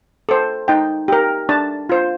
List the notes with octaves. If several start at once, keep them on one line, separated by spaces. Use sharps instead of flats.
A4 C5
D#4 G5
G4 A#4
D4 A5
F4 C5